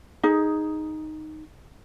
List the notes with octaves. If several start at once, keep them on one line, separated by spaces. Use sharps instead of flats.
D#4 G#4